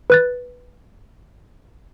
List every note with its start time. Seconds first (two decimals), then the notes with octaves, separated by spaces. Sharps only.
0.10 B4 F#6 A6